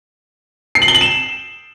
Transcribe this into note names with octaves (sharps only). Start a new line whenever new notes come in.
C7
F#7
G7
F#7
E7